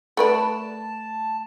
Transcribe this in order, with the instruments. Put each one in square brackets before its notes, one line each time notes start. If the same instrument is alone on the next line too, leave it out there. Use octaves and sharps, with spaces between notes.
[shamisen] A3 B4 D5 [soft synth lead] A5